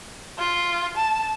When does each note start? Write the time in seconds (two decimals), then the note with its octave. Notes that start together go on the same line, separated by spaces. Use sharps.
0.38 F4
0.97 A5